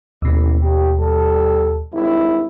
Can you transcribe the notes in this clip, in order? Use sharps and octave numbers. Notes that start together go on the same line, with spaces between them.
A1 D#2 B2
G4
G3 A4
G#1 G2 E4